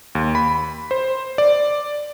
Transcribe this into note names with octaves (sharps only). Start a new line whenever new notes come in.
D#2
B5
C5
D5